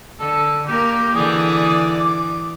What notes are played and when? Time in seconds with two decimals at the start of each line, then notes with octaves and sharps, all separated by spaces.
0.20 D3 A4
0.67 A#3 G4 A#4
1.15 D3 E3 G#4 D5
2.00 D6